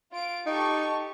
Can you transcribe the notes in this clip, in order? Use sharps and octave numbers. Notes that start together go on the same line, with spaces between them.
F4 D7
D#4 G4 A4 C#6